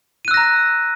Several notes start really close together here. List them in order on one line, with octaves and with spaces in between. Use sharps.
D#7 F#6 E6 A#6 A#5